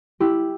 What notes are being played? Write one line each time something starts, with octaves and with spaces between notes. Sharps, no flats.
E4 G4